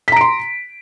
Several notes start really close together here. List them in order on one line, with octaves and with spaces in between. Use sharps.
B6 A#5 D7 C6